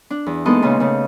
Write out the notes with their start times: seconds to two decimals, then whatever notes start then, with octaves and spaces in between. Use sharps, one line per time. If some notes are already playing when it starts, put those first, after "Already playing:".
0.11 D4
0.26 E2
0.45 G#3 A#3 B3 D#4 A4 D#5
0.62 A#2 C#3 B3 D#4
0.80 C#3 A3